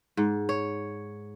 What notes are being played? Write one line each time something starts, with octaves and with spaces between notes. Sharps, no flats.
G#2
C#5